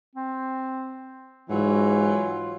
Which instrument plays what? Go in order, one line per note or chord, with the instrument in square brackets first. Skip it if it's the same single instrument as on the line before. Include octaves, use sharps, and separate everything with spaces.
[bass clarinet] C4
[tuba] G#2 [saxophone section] E3 F#3 [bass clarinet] F4